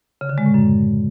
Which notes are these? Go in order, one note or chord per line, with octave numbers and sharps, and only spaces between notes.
C#3
D3
G#3
A2
F#2